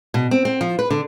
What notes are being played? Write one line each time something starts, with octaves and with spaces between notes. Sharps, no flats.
B2
C4
C4
F3
B4
D3